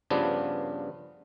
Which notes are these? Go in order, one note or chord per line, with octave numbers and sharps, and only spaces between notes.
G2 C#3 F3 B3 D4